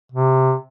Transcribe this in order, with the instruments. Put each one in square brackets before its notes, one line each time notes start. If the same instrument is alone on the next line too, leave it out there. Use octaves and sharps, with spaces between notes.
[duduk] C3